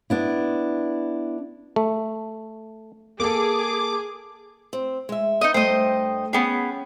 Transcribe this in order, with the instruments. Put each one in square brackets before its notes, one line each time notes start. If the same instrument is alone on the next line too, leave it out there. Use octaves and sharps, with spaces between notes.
[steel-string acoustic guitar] B3 D4 E4
[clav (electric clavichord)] A3
[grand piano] A#3 A4 [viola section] G#4 [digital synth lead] D6
[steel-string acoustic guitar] C4
G#3 E5
[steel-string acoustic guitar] B3 [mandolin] D#4 D#5
[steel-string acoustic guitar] G2 A3 G5 [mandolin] C5 D#5
[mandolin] B3 G#4 [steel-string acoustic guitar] C#4 G5